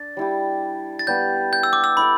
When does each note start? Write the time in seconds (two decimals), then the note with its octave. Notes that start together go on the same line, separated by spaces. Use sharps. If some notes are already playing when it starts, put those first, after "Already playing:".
Already playing: D4 D5 A6
0.17 G3 E4 G4
0.99 A6
1.07 G3 B3 G4 B4 G6
1.53 G6
1.63 E6
1.73 D6
1.84 E6
1.97 E4 A4 D5 B5